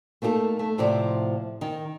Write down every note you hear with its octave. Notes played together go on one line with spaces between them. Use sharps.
A3 A#3 D#4 G4 A4
A3
A2 C3 F3 E4 D5
D#3